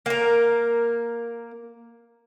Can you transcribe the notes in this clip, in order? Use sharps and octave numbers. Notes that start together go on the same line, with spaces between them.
A#3 A#4